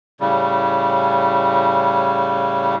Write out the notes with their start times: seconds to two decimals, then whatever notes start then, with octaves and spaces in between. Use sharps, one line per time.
0.20 A2 C#3 G3